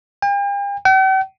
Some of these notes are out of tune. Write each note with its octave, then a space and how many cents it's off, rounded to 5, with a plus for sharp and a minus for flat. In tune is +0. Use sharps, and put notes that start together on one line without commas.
G5 +45
G5 -45